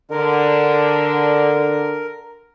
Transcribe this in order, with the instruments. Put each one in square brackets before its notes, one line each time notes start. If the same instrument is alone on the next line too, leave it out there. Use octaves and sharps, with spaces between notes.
[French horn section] D3 [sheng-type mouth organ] A#4